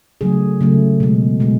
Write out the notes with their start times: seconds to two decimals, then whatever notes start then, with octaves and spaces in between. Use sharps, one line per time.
0.21 C#3 F#3 A3 G#4
0.61 C#3 F#3 A3
1.00 B2 G#3
1.40 B2 G#3